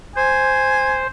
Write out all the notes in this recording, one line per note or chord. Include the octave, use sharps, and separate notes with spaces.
C5 G#5